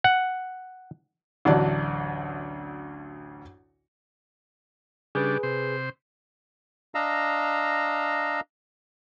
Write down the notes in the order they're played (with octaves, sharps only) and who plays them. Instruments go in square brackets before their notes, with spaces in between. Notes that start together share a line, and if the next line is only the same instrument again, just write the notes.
[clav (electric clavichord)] F#5
[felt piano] A1 D2 F#3 D4 D5
[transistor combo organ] C#3 G3 D4 [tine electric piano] G#4 B4
[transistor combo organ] C3 C5
[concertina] D4 D#5 F5 A#5 E6